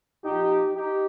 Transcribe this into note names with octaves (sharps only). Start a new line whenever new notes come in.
A#2 F3 D#4 G4
D#4 G4